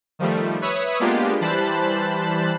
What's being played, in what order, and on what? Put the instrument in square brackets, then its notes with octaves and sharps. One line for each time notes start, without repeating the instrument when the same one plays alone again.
[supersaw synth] D#3 F3 G3 A3
B4 C#5 E5 B5 D#6
G#3 A#3 B3 D4 F4 G4
E3 G3 C5 A5 B5 F#6